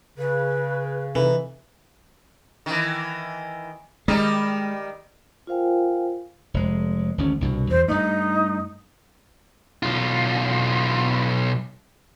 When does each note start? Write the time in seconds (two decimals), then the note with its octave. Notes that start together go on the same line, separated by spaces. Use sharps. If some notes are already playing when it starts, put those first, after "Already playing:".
0.18 C#3 B4
1.15 C3 E3 D#4 A4 B4
2.66 D#3 E3
4.08 D#3 G3 G#3 D#4
5.47 F4 A#4 C5 F5 G5 G#5
6.54 F1 G#3
7.18 G#1 D2 C#4
7.41 C2 G2 B2
7.70 E2 C5
7.88 G2 A3 D#4
9.83 B1 F4